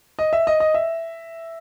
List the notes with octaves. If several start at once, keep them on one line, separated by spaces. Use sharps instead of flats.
D#5
E5
D#5
D#5
E5